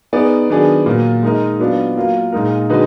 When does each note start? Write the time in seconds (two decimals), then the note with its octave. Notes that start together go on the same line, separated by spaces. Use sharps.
0.13 B3 D#4 G#4 D5
0.50 D#3 F#3 B3 D4 G#4
0.86 A#2 F#3 A#3
1.23 G#3 D#4 A#4 D#5
1.59 F#3 B3 D4 F4
1.96 F#3 A#3 F4
2.32 A#2 G#3 D#4 A#4
2.69 D3 G#3 D#4 F#4 B4